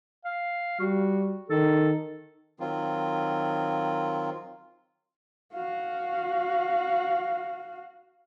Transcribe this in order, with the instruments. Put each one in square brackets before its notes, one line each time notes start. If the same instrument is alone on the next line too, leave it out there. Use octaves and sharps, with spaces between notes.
[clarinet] F5
[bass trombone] G3 [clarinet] F#4
[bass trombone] D#3 [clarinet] A4
[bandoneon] D#3 F#3 C4 F4
[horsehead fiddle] F#4 F5